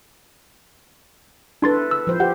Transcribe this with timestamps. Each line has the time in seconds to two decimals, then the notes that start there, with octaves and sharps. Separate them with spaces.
1.62 D4 E4 A4 B4 C6 A6
1.91 E6
2.07 F3 C5
2.20 G4 F#5